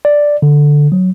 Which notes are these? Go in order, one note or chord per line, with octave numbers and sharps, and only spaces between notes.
D5
D3
F#3